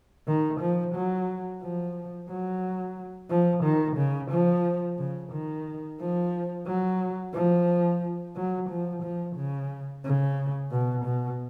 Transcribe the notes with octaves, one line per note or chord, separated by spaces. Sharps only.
D#3
F3
F#3
F3
F#3
F3
D#3
C#3
F3
C#3
D#3
F3
F#3
F3
F#3
F3
F3
C#3
C#3
B2
B2